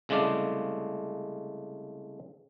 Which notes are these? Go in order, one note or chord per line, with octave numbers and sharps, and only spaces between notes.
C2 C#3 G#3 A3 D5 F5